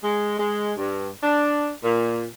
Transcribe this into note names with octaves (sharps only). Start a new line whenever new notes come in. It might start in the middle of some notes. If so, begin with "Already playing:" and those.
G#3
G#3
G2
D4
A#2